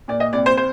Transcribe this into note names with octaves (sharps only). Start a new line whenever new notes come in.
A#2 D5
D#5
C2 D5
C5
C5